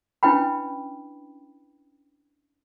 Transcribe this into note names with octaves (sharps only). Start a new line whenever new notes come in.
C#4 D4 E4 B4 G5 B5